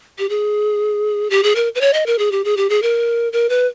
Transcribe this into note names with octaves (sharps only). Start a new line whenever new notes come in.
G4
G#4
G4
G#4
A#4
B4
C#5
D#5
A#4
G#4
G4
G#4
G4
G#4
A#4
A#4
B4